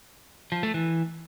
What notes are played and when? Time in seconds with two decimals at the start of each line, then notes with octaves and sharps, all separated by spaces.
0.52 F3
0.63 A3
0.74 E3